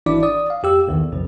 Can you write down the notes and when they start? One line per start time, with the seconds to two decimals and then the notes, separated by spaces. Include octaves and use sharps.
0.06 G#1 E3 D4 E4 D5 D6
0.23 D5 D#6
0.50 F5
0.63 F2 G4 E6
0.88 B1 E2 D#3
1.11 B1 F2 C#3 F3